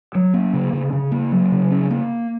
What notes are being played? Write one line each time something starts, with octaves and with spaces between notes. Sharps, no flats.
F#3
A#3
C#3
C#3
C#3
A#3
F#3
C#3
C#4
A#3